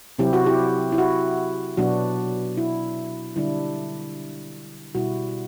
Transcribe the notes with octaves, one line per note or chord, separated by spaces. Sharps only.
C3 F#3 C4 E4 G4
F#4
E4 G4
E4
F#4
B2 F#3 B3 D4 F#4
E4
D3 G3 D4 E4
B2 G3 B3 E4 F#4